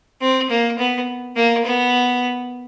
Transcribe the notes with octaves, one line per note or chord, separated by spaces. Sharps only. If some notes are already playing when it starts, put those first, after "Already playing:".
C4
A#3
B3
A#3
B3